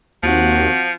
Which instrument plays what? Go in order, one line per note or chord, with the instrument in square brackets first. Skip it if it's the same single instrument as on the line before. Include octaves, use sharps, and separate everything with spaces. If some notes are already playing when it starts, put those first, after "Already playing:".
[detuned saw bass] D#2 [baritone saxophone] F3 [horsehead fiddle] C4 F#4